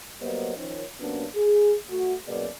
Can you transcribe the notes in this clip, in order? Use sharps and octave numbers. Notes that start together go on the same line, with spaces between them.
F#3 G3 A#3 B3 C5 D#5
D#3 F3 C#4
C3 F#3 A#3 B3 C#4 D4
G#4
A3 F#4
F#2 B2 A#3 B3 G#4 D5